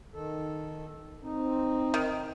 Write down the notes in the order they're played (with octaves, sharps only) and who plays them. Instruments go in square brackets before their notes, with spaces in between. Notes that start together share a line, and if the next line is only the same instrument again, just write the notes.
[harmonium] D#3 A4
[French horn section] C4 [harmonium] D#4
[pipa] D#3